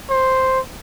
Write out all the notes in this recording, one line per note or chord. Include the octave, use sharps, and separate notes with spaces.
C5